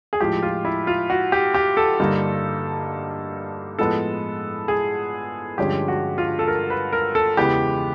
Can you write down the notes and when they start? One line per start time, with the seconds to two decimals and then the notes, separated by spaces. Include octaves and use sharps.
0.13 G#4
0.20 A2 F3 G#3 G4
0.43 F4
0.65 E4
0.87 F4
1.10 F#4
1.32 G4
1.54 G4
1.77 A4
1.99 G2 D3 G3 A#3 D#4
3.79 A2 F3 G#3 B3 A4
4.68 G#4
5.58 G2 D3 F3 G#3 C#4 G4
5.88 F#4
6.18 F4
6.39 A4
6.48 A#4
6.70 B4
6.93 A#4
7.15 A4
7.37 E2 C#3 E3 G#3 B3 G4